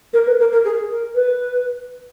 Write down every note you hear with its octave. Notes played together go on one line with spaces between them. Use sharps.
A#4
B4
A#4
A#4
G#4
A#4
B4